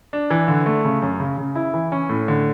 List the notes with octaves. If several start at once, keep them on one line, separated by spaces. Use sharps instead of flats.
D4
E3
D3
A3
C#3
F#2
C#3
C#3
E4
E3
C#4
A2
D3